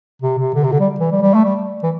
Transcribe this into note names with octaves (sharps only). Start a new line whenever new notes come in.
C3
C3
D3
C3
D3
G3
E3
G3
G3
A3
G3
E3